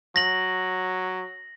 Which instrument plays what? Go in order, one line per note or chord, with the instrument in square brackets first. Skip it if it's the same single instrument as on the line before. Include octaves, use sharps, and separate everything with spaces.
[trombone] F#3 [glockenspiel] A#6 F#7